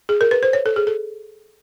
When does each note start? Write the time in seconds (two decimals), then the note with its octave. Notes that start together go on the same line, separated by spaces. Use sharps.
0.09 G#4
0.21 A#4
0.31 B4
0.43 C5
0.53 C#5
0.66 A4
0.76 G#4
0.87 A4